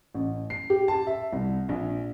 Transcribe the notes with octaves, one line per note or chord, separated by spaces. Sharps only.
A1
C7
G4
A5
E5
C2
A#1